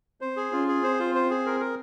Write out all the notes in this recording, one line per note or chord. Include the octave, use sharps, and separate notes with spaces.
C4 C5
G#4
C#4 F4
G#4
C4 C5
F4
C5
G#4
A#4
A#4